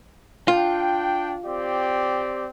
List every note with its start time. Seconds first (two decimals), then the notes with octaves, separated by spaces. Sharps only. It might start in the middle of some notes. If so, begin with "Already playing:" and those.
0.48 D4 F4 G5
1.45 C4 G4 D5